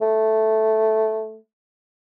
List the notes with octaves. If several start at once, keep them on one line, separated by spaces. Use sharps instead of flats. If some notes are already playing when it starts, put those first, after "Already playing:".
A3